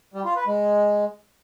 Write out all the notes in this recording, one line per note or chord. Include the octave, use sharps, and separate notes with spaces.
G3
F4
B4
G#3